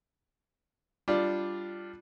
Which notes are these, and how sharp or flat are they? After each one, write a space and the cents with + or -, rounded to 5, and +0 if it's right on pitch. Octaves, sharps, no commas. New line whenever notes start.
G3 +0 D4 +5 F4 -5